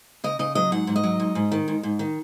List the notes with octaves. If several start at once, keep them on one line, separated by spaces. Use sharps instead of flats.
C#3 D#5
C#3 D#5
F#3 D#5
G#2 F#5
G#2
D#5
F#3
G#2
G#2
D#3
G#2
G#2
D#3